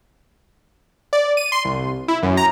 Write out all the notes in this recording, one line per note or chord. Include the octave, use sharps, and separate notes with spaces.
D5
D#7
C6
C2
E4
F#2
A#5